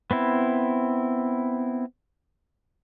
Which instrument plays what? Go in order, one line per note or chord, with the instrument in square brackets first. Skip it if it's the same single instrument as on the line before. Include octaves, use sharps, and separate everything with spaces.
[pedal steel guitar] B3 C4 E4